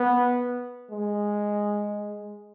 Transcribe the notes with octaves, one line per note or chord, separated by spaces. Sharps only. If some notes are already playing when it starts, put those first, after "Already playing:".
Already playing: B3
G#3